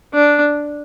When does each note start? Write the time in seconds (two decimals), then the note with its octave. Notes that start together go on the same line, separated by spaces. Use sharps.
0.14 D4